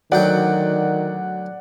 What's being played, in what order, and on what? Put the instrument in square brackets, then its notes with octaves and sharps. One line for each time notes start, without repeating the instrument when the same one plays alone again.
[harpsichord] D2 F#3 G5 [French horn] D#3 [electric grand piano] D5 F#5